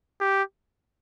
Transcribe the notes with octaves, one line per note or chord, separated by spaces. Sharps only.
G4